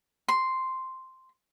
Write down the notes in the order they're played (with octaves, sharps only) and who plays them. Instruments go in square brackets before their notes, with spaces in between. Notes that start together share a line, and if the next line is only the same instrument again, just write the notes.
[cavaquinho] C6